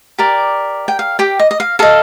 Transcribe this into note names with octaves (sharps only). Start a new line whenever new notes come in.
G4 A#4 D5
G5
F5
G4 G5
D#5
D#5
F5
A4 D#5 F5